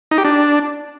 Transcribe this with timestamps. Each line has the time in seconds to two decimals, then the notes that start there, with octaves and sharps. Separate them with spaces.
0.11 D#4
0.18 G4
0.25 D4